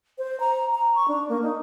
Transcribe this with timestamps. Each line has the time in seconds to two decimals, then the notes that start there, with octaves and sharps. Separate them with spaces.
0.18 C5
0.40 A#5
0.75 A#5
0.95 C#6
1.08 D4
1.29 A#3
1.43 D#4